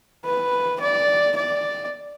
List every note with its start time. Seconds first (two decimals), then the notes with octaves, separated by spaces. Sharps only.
0.25 B4
0.81 D5
1.36 D5